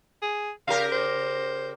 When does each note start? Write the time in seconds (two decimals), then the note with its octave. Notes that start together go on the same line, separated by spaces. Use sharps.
0.22 G#4
0.68 C#3 G4 A#4 F5
0.92 C5